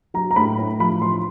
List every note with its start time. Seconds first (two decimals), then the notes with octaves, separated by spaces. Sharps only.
0.14 F#3 A#5
0.31 A#5
0.36 A2 B5
0.59 A2
0.80 F3 B5
1.02 F3 C6